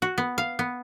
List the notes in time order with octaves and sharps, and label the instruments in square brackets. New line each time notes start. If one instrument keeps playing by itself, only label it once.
[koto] F#4
B3
F5
B3